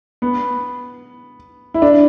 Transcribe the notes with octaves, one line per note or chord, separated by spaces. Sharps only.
B3
E4
D4